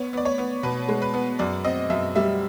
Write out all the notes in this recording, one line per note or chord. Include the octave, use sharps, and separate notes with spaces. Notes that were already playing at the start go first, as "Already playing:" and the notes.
Already playing: B3 C#5
B3 D5
C#5
B3
B2 B4
G#3
B4
B3
F#2 D5
C4 D#5
F#2 E5
G3 E5